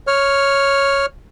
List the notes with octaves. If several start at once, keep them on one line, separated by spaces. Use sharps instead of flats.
C#5 F6